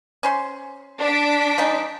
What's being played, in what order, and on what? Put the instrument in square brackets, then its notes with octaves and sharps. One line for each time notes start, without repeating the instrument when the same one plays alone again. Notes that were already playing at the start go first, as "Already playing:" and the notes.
[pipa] C#4 C5 C6
[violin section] D4 B6 D7
[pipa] F3 G#3 D#4